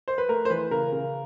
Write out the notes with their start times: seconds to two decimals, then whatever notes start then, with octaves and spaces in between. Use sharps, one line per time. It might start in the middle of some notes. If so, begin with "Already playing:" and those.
0.08 C5
0.18 B4
0.29 A3 A#4
0.45 C5
0.50 E3 B4
0.71 C#3 A#4
0.93 C#3